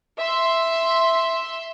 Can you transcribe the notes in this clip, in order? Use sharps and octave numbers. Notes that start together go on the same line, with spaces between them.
E5 C6